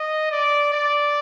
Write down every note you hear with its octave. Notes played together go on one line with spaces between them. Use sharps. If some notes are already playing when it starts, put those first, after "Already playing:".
Already playing: D#5
D5
D5